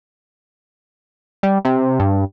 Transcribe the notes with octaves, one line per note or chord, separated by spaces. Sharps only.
G3
C3
G2